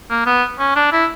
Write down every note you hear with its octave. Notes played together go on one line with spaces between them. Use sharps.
A#3
B3
C#4
D4
E4